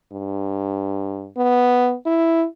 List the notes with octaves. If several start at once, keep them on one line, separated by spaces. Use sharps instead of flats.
G2
B3
E4